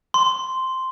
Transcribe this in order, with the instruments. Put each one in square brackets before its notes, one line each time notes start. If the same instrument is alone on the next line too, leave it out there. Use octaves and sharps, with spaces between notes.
[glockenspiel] C6